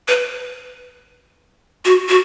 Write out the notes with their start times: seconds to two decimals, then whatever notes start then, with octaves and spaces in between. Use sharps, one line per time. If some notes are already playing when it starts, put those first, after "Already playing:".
0.08 B4
1.85 F#4
2.09 F#4